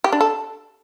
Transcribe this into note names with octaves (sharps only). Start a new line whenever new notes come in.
G4
D4
A4